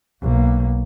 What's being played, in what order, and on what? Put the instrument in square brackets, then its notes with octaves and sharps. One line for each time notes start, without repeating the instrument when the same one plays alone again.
[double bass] B1 A#3